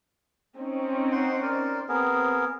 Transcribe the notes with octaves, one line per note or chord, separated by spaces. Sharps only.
C4 C#4 D#4
C5 F#5 C6
A#4 C5 D5
B3 C4 G#4 A#4